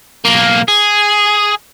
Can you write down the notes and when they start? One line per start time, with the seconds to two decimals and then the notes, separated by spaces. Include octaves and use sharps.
0.25 B1 A#3
0.68 G#4